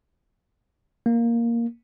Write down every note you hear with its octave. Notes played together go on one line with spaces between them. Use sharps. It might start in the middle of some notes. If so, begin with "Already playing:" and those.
A#3